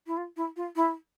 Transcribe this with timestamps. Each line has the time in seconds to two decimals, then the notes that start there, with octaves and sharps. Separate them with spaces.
0.07 E4
0.17 F4
0.37 E4
0.56 F4
0.76 E4